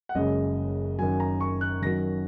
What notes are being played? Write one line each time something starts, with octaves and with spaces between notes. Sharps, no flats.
F#5
F#1 F#2 C#3 G#3 D#5
F#2 D#3 F#3 G#5
A#5
C#6
F#6
F#2 D#3 F#3 A#6